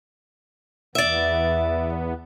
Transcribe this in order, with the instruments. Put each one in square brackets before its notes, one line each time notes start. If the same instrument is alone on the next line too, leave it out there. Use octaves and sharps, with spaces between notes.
[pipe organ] E2 B3 [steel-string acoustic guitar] D5 E5